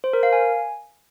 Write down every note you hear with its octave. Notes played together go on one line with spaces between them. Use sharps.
C5
A#4
F5
G#5